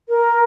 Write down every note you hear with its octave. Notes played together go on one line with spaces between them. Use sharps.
A#4